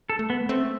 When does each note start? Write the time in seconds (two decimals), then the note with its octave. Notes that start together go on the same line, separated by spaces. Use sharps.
0.10 A4
0.19 A3
0.30 B3
0.49 A3 C4